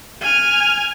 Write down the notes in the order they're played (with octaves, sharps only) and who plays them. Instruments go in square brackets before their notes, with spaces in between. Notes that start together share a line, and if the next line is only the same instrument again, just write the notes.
[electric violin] G#5 F6